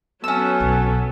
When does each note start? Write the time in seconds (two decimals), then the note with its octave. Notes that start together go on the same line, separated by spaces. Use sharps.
0.24 F#3 B3 C#4 A4 E6
0.60 B1